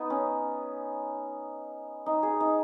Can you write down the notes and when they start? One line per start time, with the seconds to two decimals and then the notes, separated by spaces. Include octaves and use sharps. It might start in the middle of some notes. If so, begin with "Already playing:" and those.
Already playing: B3 D#4
0.10 C#4
2.06 D#4
2.23 G#4
2.40 D#4